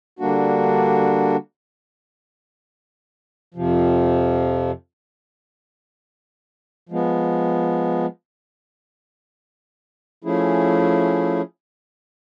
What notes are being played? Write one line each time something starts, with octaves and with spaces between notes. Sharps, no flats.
D3 G3 A#3 D4 F#4
F2 C3 F3
F3 G#3 B3
F3 A3 C#4 E4 G#4